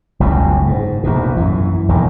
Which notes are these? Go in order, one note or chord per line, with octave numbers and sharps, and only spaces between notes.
F#1 C#2 G2 B2
G#2
A#1 D#2 B2
F#2 E3
E1 A#1 F#2 D#3